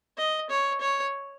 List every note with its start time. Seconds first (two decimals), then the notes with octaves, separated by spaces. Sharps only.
0.18 D#5
0.50 C#5
0.81 C#5